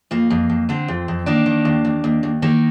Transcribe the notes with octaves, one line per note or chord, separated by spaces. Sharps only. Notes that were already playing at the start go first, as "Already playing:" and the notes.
F2 A#3
F2
F2
D3 C4
F2
F2
D#3 A#3 D4
D#3
D#2
D#2
D#2
D#2
D#3 A#3